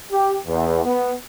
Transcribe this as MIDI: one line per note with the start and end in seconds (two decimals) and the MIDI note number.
0.12 0.34 67
0.47 0.79 40
0.84 1.12 59